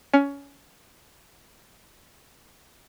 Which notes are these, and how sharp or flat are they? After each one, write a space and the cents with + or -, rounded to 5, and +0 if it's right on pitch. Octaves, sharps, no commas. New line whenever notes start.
C#4 +20